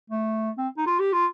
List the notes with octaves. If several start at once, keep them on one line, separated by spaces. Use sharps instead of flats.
A3
C4
D#4
F4
G4
F4